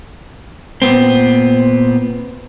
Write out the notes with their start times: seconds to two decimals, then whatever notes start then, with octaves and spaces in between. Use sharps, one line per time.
0.82 A#2 B3 C4